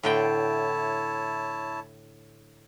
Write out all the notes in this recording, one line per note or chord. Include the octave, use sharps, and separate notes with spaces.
A2 D3 E4 C#5 G5 A5